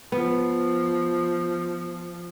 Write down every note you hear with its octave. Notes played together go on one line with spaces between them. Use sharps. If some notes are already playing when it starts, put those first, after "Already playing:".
F3 B3